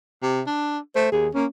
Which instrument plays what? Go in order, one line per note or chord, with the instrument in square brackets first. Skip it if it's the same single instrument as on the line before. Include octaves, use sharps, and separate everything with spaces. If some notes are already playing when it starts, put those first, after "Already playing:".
[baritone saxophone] C3
D4
[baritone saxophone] A3 [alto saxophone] C5
[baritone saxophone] D#2 [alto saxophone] G#4
[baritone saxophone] A#3 [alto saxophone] C#4